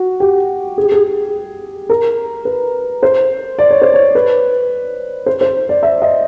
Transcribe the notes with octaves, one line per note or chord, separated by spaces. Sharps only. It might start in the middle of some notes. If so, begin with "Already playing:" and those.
Already playing: F#4
G4
G#4
G4
G#4
A#4
B4
C5
D5
C#5
C5
C#5
B4
C5
C5
D5
E5
D#5